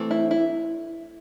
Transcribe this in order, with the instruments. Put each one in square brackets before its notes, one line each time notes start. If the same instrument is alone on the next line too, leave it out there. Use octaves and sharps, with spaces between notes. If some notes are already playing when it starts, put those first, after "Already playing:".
Already playing: [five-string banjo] E3 A3 C4
E4
E4